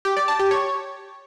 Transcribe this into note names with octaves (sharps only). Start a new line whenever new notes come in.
G4
D5
A5
G4
C#5